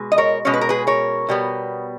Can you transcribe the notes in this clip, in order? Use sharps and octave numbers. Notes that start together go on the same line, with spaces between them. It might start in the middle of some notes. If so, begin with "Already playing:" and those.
Already playing: B2 G#3
D#5
A#4 C#5
B2 G#3 C#4 C#5
B4
A#4
G#4 B4
A#4 C#5
B2 G3 B3